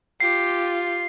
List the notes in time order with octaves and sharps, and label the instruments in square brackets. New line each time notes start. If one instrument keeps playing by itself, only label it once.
[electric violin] F4 [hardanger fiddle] G4 [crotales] C7